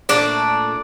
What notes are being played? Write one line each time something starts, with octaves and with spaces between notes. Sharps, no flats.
A#2 F#3 A3 D4 D5